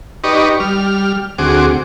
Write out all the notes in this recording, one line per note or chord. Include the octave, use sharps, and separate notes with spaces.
D#4 G4 B4 D5 D#5 C#6
G3 F6
D2 C4 F#4 G#4 D6